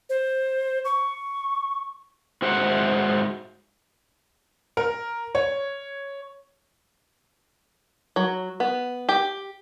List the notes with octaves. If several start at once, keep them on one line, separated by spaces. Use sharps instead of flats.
C5
C#6
G#2 F#4 C5 E5 F#5
A#4
C#5
F#3
B3
G4